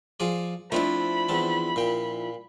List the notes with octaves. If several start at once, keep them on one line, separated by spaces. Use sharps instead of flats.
F3 G#4 D5
F3 A3 C4 D4 E4 B5
E2 C4 A5
A#2 G5